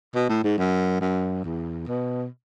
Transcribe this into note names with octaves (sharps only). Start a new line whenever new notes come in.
B2
A2
G#2
F#2
F#2
E2
B2